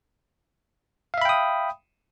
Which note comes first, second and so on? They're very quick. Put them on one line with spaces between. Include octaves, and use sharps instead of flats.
F5 E5 B5 G5 D#6